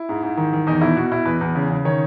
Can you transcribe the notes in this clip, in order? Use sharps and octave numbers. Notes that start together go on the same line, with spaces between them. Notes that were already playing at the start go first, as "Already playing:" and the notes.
Already playing: E4
G#2
G#2
D#3
D#3
E2 D#4
B2 E4
B2 F#4
B2 E4
E2 B4
E2
C#3
C#3
D#3 C#5